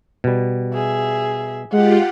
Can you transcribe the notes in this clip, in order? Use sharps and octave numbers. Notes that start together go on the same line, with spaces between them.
B2 G3
G#4 E5
G#3 F4 G4 F#5